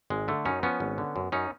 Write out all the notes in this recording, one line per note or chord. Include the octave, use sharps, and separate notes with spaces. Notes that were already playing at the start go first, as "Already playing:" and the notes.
G#1 G#3
D3 A3
F#2 C#4 D#4
F3 B3 C#4
G#1
D3
F#2
F#2 C#4 D#4